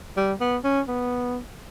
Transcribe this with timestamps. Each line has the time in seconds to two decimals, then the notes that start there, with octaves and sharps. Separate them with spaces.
0.17 G3
0.41 B3
0.64 C#4
0.88 B3